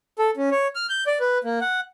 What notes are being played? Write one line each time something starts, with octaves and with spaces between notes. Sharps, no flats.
A4
C#4
C#5
F6
G6
D5
B4
A#3
F#5